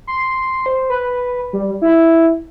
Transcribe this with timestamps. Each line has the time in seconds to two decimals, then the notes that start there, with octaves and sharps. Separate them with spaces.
0.07 C6
0.66 C5
0.90 B4
1.53 G3
1.82 E4